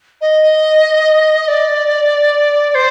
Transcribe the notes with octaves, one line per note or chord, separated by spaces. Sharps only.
D#5
D5
C5